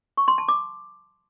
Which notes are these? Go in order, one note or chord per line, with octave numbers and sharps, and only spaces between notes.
C#6
C6
A5
D6